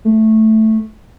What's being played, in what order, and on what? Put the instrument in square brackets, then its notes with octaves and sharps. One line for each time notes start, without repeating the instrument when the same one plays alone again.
[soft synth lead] A3